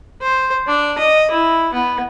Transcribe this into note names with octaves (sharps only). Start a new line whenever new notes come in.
C5
D4
D#5
E4
B3